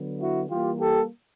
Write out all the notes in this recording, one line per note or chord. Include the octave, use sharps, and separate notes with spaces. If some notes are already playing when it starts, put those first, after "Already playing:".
Already playing: D3 F#3 B3
E4 F#4
E3 G3 A#3 F4 G4
G4 A4